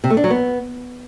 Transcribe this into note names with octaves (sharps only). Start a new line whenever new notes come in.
C3
A3
D4
F#3
B3